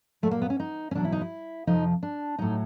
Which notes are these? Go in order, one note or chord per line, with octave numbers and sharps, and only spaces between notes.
A#2 F#3 A3
A#3
B3
C#4
D#4
C#4
E2 B2 F#3 D4
E4
D#4
E4
F2 C3 F3 D#4
D4
A2 F#3 D#4